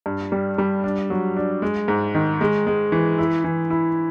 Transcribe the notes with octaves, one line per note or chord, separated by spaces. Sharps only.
G2
G3
G3
D4
F#3
D4
G#3
G#2
D#3
G#3
G#3
E3
E4
E3
E4